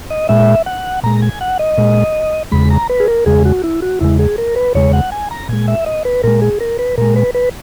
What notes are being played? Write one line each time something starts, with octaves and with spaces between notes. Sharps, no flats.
D#5
A#2 G#3 E5
F#5
A#2 G#3 A#5
G#5
F#5
D#5
A#2 G#3
E2 C#3 G#3 B5
A#5
B4
G#4
A#4
E2 C#3 G#3 G#4
F#4
E4
F#4
E2 C#3 G#3 E4
G#4
A#4
B4
E2 C#3 G#3 C#5
F#5
G#5
A#5
A#2 G#3 G#5
E5
D#5
B4
A#2 G#3 A#4
G#4
A#4
B4
A#2 G#3 A#4
B4
B4